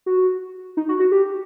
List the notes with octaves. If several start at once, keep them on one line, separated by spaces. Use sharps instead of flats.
F#4
D#4
F#4
F#4
G4